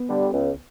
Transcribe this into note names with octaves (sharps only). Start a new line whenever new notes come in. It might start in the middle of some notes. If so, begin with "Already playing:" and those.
Already playing: B3
D3 G3
C#2